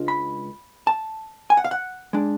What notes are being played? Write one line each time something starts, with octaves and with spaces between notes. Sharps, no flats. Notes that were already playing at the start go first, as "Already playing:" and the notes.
Already playing: C#2 G#3 D4 F4
B5
A5
G#5
F#5
F5
F#5
G#3 D4